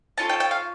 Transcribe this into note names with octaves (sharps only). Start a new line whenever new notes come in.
C#4 F4 A4 A5
G5
G5
F5